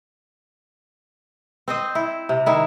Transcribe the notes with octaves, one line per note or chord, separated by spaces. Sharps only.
C4 C5 D#5
E4
C3
D#3 E4